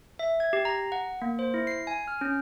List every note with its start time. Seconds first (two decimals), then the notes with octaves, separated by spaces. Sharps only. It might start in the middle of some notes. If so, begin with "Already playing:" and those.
0.19 E5
0.40 G#6
0.53 G4
0.65 A#5
0.92 F#5
1.22 A#3
1.39 C5
1.54 E4
1.67 C7
1.87 G#5
2.08 F6
2.21 C#4